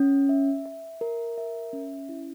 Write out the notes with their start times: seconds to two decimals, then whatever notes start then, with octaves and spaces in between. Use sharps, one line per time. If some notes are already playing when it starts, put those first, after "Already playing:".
Already playing: C#4
0.29 E5
0.65 E5
1.01 A#4
1.38 E5
1.73 C#4
2.09 E4